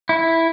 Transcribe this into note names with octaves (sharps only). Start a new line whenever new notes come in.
E4